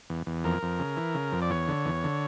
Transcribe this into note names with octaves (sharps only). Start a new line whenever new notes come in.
E2
E2
F2 A#4
F2
C#3
E3
C#3
F2
D5
E2 C#5
D3
E2
D3